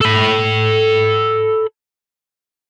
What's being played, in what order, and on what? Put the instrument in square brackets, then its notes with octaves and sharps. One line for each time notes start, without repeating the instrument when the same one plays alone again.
[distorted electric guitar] A4 B5